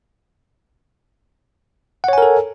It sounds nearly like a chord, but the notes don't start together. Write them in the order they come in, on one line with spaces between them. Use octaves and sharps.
F#5 C#5 G#5 A#4 A4